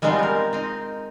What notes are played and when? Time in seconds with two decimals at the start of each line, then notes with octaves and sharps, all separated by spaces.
0.02 G3 G#3 B3 C4 D#4 F4
0.19 G#3 A#4
0.53 C4 D#4